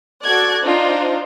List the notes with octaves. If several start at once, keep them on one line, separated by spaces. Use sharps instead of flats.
F#4 A4 D5 F#6 G#6
D4 D#4 F4 C5